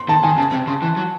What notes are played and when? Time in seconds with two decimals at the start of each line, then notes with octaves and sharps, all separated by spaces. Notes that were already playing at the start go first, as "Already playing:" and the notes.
Already playing: C6
0.08 D#3 A5
0.24 D#3 G#5
0.38 C#3 A5
0.52 C3
0.67 C#3 C6
0.82 E3
0.97 F#3